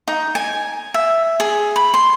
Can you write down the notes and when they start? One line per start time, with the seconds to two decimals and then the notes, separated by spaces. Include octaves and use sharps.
0.08 D#4
0.35 G#5
0.94 E5
1.40 G#4
1.76 B5
1.94 C6